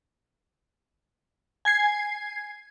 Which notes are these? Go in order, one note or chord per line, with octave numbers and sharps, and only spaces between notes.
G#5 G#6 C7